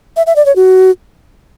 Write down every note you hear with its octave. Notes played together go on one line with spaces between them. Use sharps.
E5
E5
D5
C#5
F#4